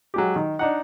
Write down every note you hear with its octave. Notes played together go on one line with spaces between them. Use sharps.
F#3 G#3 G4
D#3
D4 D#4 F#5